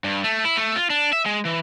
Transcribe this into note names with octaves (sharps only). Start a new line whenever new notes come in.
G2
A3
E4
A3
F4
D4
E5
G#3
E3